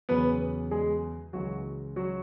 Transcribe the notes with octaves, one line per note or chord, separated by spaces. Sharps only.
E2 C#3 F#3 B3 B4
G#3 G#4
C#2 C#3 E3 F#3 F#4
F#3 F#4